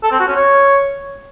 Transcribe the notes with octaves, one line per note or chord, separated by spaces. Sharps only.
A4
C4
F#4
C#4
C#5